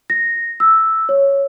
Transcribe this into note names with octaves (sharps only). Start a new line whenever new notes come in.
A#6
E6
C#5